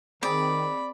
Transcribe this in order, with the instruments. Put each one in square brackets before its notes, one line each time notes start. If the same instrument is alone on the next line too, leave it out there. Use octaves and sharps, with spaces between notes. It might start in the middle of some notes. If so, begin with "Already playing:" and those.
[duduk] D#3 [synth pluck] C4 G#4 [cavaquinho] D5 [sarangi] B5